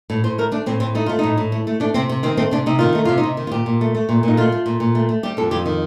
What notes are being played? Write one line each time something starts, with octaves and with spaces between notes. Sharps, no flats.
A2
A2 C5
A3 A#4
A3 D4
A2 C4
A2 C4
A3 D#4
A3 F4
A2 D#4
A2
A3
A3
A3 D4
C3 C4
C3
D#3 C4
A3 C4
C3 D4
C3 D#4
D#3 F4
A3 D#4
C3 F4
D#4
C3
D#3
F4
A#2 G4
A#2
A3
A3
A#2
A#2 D#4
A3 F4
A3
A#2
A#2
A3
A3
G3 G4
F2 A4
F2 G4
D#3